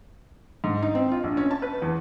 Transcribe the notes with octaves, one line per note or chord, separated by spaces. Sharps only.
G#2
D#4
C4
F4
A#1
C#4
A5
B4
E2